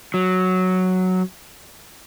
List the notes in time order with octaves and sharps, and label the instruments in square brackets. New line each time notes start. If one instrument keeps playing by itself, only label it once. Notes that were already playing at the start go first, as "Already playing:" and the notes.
[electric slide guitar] F#3